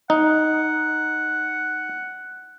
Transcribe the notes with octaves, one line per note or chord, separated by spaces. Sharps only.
D#4 F#5